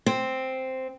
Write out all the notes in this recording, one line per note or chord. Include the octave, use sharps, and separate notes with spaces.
C4